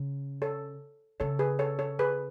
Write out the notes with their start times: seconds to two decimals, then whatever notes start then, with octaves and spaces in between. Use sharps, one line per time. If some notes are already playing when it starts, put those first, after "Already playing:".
Already playing: C#3
0.42 A4 C#5
1.20 C#3 A4 C#5
1.39 G#4 B4
1.59 A4 C#5
1.79 A4 C#5
1.99 G#4 B4